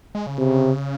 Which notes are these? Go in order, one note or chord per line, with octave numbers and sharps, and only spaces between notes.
G#3
C#3
C3